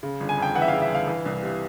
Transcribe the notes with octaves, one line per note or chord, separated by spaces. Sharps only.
C#3
G1
G#5
F2 G5
E3 F#5
E5
C#3 F5
E5
G1 F5
E3
C2
C3